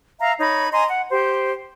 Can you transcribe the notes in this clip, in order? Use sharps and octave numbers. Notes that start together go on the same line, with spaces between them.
E5 F5 A#5
D#4 C#5 B5
D#5 G#5 A#5 C6
F#5
G4 C5